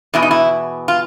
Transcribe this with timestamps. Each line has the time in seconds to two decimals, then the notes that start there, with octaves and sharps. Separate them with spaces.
0.14 E2 B2 E4
0.22 D#4
0.31 E4
0.88 F4